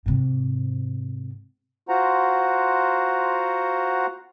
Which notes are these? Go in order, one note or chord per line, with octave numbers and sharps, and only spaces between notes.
G#2 C3
F4 F#4 C5 F#5 A#5